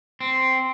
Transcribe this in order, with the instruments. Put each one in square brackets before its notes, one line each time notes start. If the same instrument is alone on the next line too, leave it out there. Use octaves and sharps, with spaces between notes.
[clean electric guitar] C4